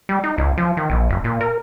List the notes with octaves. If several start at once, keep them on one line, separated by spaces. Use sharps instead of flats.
G3
D#4
C#2
F3
D#3
A#1
F#1
A#2
A#4